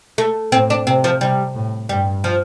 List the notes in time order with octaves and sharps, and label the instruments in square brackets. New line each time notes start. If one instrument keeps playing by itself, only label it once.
[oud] A3
[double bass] A2 [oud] C4
[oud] D4
[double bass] C3 [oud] C4
[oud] F3
[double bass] C3 [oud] G3
[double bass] A2
[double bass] G2 [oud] G3
[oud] F3